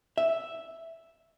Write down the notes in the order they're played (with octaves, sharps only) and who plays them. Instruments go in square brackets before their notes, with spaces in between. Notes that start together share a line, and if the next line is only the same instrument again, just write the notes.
[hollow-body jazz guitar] E5